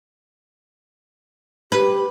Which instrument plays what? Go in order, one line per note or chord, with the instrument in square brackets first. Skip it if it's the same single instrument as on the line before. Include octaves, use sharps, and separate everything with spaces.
[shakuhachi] G4 [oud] B4